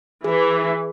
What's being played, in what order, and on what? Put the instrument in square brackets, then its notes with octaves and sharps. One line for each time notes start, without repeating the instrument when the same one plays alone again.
[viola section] E3 [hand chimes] G#4